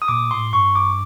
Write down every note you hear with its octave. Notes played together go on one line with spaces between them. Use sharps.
D#6
A#2 D6
A2 C6
G2 C#6
D6